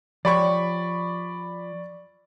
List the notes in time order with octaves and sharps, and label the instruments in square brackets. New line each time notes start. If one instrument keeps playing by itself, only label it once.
[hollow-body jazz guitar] F3 G4 C#5 [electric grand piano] D5 B5 C#6